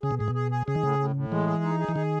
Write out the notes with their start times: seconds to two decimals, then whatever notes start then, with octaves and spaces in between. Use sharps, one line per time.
0.03 C#3 G#4
0.11 B2
0.19 A2 G#4
0.28 B2
0.35 G#4
0.52 G#4
0.67 C#3 G#4
0.75 D#3
0.83 A2 C#3
0.99 A2
1.16 A2
1.31 E3 G#3
1.47 G#4
1.64 D#4
1.80 G#4
1.89 E3
1.96 D#3 G#4